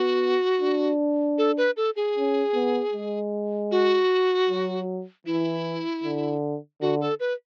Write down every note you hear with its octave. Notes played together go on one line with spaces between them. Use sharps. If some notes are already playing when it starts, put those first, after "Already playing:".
Already playing: B3 F#4
D4
A4
B4
A4
G#4
C#4
B3
G#3
F#4
F#3
E3 E4
D3
D3 F#4
A4
B4